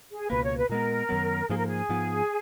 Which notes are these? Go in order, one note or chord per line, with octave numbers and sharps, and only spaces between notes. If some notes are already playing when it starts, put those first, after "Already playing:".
G#4
C#2 B2 A#3 B4
C#5
B4
A#2 G#3 B3 A#4
F#2 D#3 F#3 B3
G#2 F3 A#3 G#4
A#4
G#4
G#2 F3 B3